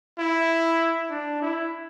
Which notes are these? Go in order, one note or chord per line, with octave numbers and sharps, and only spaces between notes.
E4
D4
E4